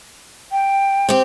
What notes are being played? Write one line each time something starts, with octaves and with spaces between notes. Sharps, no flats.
G5
C4 G4